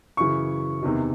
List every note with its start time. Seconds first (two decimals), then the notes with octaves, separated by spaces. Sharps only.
0.17 F#2 C#3 E3 C#6
0.83 E2 C3 D#3